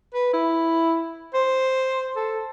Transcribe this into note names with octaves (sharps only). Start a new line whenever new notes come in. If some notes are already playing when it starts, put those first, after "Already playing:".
B4
E4
C5
A4